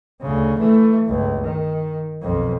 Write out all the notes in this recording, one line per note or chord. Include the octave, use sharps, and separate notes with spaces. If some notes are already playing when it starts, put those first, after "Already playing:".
D2 C#3
E3 A3
G1 C#2
D#3
B1 F2